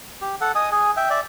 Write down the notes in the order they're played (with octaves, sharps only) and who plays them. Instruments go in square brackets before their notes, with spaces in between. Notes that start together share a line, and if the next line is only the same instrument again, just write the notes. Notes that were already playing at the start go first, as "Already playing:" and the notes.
[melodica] G4
A4 F#5
D#5 G#5 D#6
G#4 G#5
E5 G5
D5 E5